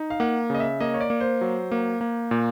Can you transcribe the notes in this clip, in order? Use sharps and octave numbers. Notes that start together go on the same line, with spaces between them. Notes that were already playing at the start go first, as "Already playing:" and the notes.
Already playing: D#4
F5
A#3 F#5
C#3 D#5
E5
A#3 D#5
C#5
D5
A#3
C5
F#3
A#3
A#3
A#2